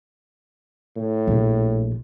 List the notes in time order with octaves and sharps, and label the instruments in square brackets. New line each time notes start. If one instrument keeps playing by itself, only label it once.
[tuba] A2
[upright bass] A#1